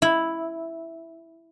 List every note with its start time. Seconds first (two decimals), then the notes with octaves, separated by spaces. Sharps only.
0.02 E4